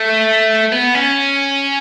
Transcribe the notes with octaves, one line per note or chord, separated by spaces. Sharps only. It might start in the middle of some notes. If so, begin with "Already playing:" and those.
Already playing: A3
B3
C#4